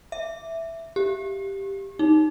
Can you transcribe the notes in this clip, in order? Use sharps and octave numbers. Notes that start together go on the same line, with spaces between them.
E5
G4
D#4